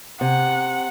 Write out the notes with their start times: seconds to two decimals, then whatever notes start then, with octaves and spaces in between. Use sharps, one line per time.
0.21 C3 F#5